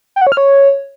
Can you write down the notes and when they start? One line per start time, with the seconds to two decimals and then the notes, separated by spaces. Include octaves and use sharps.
0.16 G5
0.21 F#5
0.27 C#5
0.32 F6
0.37 C#5